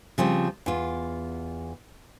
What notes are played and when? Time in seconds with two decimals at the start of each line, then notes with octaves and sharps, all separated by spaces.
0.18 C#3 F3 G3 C4
0.66 E2 F4